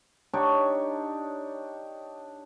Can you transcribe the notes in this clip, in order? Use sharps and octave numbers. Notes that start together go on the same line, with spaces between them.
D4 D#4 G4 C#5